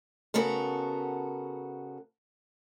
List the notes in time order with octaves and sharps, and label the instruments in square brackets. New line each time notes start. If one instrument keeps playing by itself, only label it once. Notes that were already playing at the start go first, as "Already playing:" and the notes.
[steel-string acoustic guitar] C#3 B3 F#4 A4 A#4